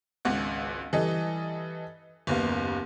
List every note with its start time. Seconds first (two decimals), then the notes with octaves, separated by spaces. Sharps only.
0.25 G#1 C#2 F#5
0.93 E3 G3 A4 D#5
2.27 F#1 D#2 B3 F5